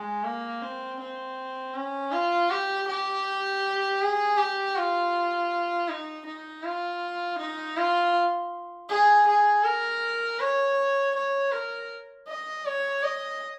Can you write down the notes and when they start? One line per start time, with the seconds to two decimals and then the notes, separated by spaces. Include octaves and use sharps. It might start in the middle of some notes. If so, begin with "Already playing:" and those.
Already playing: G#3
0.24 A#3
0.62 C4
1.00 C4
1.75 C#4
2.12 F4
2.51 G4
2.88 G4
4.01 G#4
4.38 G4
4.76 F4
5.89 D#4
6.26 D#4
6.64 F4
7.39 D#4
7.77 F4
8.89 G#4
9.27 G#4
9.65 A#4
10.40 C#5
11.16 C#5
11.52 A#4
12.28 D#5
12.66 C#5
13.03 D#5